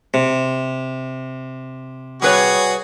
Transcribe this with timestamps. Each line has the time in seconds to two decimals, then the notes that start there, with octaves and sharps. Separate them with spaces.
0.14 C3
2.22 G3 F#4 G#4 B4 C#5